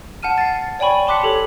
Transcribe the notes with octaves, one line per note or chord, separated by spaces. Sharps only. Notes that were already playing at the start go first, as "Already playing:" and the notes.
F#5 A5 F6 D#7
A6 C7
A6
C#5 D5 G5 G#5 B5 C#6
A5 C6 D6 F#6 B6 C#7
G4 A4 C#5